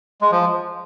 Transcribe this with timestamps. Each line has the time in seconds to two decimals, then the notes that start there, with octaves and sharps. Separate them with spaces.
0.21 G#3
0.31 F3